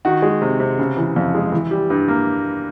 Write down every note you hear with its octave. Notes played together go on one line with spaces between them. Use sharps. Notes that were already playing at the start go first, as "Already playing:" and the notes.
D#3 F#4
G#3
C3
C3
C#3
E3
F2
G#3
E3
G3
G2
A#3